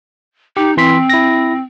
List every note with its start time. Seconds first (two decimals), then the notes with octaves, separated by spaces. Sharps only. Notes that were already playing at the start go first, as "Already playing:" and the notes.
0.57 D#4 G4
0.77 E3 C4 C6 B6
1.10 E4 A#6